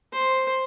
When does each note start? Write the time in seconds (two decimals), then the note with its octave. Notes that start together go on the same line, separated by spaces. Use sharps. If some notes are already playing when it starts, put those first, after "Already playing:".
0.13 C5